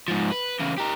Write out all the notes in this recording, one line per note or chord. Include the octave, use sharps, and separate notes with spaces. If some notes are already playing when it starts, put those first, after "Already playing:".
G#2 F3
B4
C#3 E3
G4 A#4